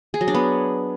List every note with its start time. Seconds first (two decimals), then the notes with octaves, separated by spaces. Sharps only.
0.14 G#4
0.21 F#3
0.28 D4
0.34 B3